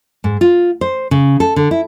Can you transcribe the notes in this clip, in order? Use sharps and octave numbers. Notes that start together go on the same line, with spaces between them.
G#2
F4
C5
C#3
A4
D3
E4